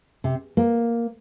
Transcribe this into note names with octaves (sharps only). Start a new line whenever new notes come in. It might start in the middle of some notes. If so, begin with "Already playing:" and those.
C3
A#3